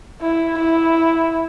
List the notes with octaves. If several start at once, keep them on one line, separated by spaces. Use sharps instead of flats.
E4
E4